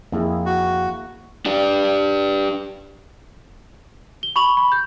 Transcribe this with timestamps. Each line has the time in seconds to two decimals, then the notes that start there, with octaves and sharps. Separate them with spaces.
0.12 F2 A#3 E4 G#4
0.46 F#4
1.46 D4 G4 D5
4.23 G7
4.36 B5 C#6 F7 F#7
4.57 B5
4.72 G6